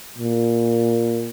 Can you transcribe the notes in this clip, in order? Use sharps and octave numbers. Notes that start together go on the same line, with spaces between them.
A#2